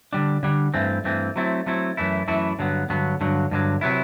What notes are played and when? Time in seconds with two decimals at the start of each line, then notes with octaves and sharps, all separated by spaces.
0.13 D3 G3 D4
0.43 D3 G3 D4
0.74 G2 E3 A3 C4
1.04 G2 E3 A3 C4
1.36 F#3 A3 C4 E4
1.66 F#3 A3 C4 E4
1.97 F#2 E3 A3 E4
2.28 F#2 E3 A3 E4
2.59 G2 D3 F#3 B3
2.89 G2 D3 F#3 B3
3.21 G2 D3 F#3
3.51 G2 D3 F#3
3.81 C3 F#3 B3 E4